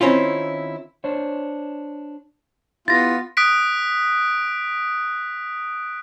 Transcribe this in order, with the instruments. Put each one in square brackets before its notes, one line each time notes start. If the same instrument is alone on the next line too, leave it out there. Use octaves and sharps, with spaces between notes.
[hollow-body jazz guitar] D#3 C4 C#4 E4 F4
[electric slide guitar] D4 C5 C#5
[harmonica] B3 F4 [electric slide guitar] E4 G4 [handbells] A6 A#6
[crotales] D#6 F#6 B6 D7